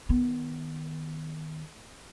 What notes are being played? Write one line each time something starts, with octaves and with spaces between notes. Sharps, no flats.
D#3 B3